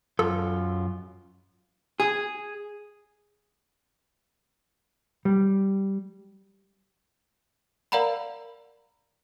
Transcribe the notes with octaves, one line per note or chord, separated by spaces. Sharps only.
F#2 F4 A4
G#4
G3
A#4 D5 F5 F#5 A#5 B5